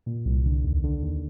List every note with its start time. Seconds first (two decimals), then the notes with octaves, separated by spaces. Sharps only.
0.06 A#2
0.25 C2
0.46 D3
0.64 D#2
0.84 D3
1.03 D#2